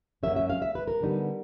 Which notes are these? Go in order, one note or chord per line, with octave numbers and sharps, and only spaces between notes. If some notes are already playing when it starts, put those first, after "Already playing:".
F#2 D3 F#3 A#3 C#4 E5
E5
F5
E5
B4
A#4
D3 G3 B3 D#4